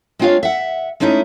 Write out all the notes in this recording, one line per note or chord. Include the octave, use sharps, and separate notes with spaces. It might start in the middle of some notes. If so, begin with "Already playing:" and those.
G#3 C4 D4 F4 C#5 F5
E5 F#5
G#3 A3 C#4 D#4 E4